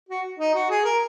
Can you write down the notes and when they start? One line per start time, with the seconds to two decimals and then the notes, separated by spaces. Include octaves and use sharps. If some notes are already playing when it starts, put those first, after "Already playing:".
0.09 F#4
0.39 D#4
0.54 F#4
0.70 G#4
0.85 A#4